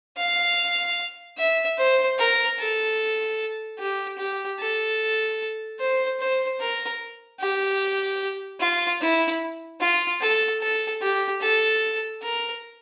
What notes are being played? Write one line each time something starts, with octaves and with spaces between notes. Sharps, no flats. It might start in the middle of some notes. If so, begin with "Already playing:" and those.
F5
E5
C5
A#4
A4
G4
G4
A4
C5
C5
A#4
G4
F4
E4
F4
A4
A4
G4
A4
A#4